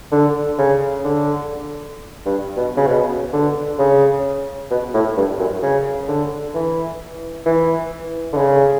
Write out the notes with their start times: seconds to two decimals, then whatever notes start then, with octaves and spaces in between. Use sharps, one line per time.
0.12 D3
0.58 C#3
1.04 D3
2.26 G2
2.57 B2
2.77 C#3
2.88 B2
3.33 D3
3.79 C#3
4.70 B2
4.94 A2
5.17 G2
5.39 F#2
5.62 C#3
6.08 D3
6.54 E3
7.46 E3
8.33 D3
8.37 C#3